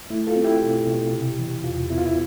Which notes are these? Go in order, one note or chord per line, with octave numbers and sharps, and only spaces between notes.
A3 E4
F4 A4
C4
E4 G4
B2
B2
C3
E3
E2 F4
B3 E4
F4
E4